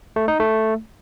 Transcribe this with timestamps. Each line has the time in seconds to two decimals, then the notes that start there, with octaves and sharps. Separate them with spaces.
0.16 A3
0.28 D#4
0.40 A3